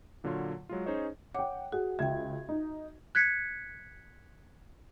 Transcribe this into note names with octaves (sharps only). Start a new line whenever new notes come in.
A#2 D3 F#3 F4 C#5 C6
F#3 G#3 F4
C#4 D#4 G#4 C5 C#5 D#5
C#5 F#5 G5 D6
F#4 G#4 F#5
C#2 E5 G5 G#6
D#4
F#6 G#6 B6 C#7